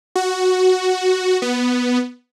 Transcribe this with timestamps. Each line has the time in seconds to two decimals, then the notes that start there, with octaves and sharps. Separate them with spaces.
0.15 F#4
1.42 B3